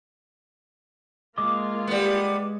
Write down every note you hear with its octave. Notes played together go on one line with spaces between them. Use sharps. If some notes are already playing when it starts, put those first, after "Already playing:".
G#3 A#3 F4 D#5 D6
G3 B3